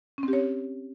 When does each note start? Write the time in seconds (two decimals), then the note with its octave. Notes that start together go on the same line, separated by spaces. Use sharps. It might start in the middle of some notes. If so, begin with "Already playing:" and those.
0.18 C#4
0.23 C4
0.28 G4
0.33 C#5